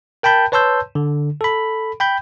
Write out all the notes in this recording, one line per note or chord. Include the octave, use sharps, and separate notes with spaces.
A#4 G5 A5 B5 G6
B4 C#5 A5 C6 E6 G6
D3
A4 B5
G5 B5 G6